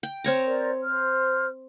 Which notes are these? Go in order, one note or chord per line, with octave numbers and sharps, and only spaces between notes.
G5
C4 C#5 A#5
A#4 C5 D5
C5 F6